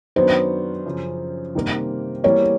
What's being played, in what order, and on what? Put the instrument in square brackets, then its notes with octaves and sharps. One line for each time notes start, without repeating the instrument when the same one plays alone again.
[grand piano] F#2 D#3 F#3 B3 D4 [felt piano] C5
[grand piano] F#2 C#3 F3
C3 D#3 G3 A#3
[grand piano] E3 G3 A#3 [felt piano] C#5